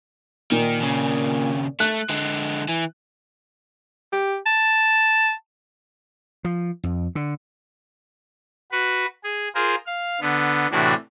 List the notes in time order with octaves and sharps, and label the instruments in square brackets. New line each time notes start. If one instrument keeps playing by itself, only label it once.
[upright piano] A#2 [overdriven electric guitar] D#3
[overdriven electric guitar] D#2 C#3
[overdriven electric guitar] A3 [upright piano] F#6
[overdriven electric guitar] D3 G#3
E3
[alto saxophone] G4
A5
[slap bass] F3
F2
D3
[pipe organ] F#4 B4
G#4
F4 G#4 A#4 C5
F5
D3 B3
A2 C3 E3 D4 F#4